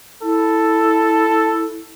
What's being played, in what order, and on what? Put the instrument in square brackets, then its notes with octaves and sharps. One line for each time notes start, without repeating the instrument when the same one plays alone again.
[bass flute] E4 [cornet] A4